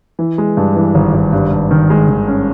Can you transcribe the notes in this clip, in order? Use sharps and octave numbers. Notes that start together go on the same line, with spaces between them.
E3
G#3
G2
E3
G#1
G#1
G2
G2
D#3
G#3
D#3
C#4